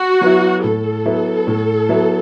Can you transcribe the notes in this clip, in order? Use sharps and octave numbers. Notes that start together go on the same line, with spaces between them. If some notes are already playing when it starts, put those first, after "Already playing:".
Already playing: F#4
F#3 B3 E4
A2 A4
F#3 B3 E4
A2
F#3 B3 E4